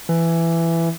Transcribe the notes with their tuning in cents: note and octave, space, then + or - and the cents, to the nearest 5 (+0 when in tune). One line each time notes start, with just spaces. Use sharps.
E3 +15